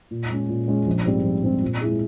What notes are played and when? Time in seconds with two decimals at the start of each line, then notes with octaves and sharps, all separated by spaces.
0.11 A#2
0.30 G#3 C#4
0.49 A#2
0.68 G#3 C#4
0.87 A#1
1.05 G#2 G3 C4
1.24 A#1
1.43 G#2 G3 C4
1.62 A#2
1.81 G#3 E4 G#4